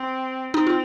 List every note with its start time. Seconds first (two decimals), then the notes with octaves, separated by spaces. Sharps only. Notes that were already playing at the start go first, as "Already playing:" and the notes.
Already playing: C4
0.54 C4 D#4
0.67 F4